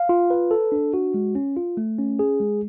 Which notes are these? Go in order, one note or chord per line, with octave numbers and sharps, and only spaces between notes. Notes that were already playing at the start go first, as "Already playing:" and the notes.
Already playing: F5
F4
B4
A4
D4
F#4
G#3
C#4
F4
A3
C#4
G#4
G#3